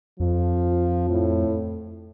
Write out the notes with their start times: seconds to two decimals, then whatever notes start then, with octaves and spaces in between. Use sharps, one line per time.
0.20 F2 F3
1.09 A2